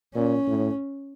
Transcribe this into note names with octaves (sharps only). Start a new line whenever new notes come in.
A#2 C#4
A2